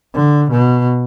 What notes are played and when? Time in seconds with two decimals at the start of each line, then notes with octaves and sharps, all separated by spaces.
0.15 D3
0.51 B2